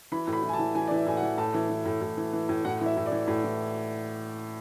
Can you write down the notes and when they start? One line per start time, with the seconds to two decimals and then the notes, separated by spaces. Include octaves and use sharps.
0.12 E3 B5
0.27 A2
0.33 B5
0.43 E3
0.49 G#5
0.53 A5
0.59 E3
0.75 E3 G#5
0.87 D5
0.91 E3 E5
1.07 A2 G#5
1.17 F#5
1.22 E3
1.37 A2 A5
1.54 E3
1.69 E3
1.85 A2
2.01 A2
2.17 E3
2.33 E3
2.49 A2
2.65 A2 F#5
2.81 E3
2.86 E5
2.97 A2
3.06 D5
3.11 E3
3.28 A2
3.44 E3